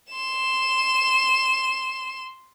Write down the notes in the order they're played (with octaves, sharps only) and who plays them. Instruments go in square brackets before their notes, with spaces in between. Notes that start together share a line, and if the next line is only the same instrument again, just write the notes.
[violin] C6 E7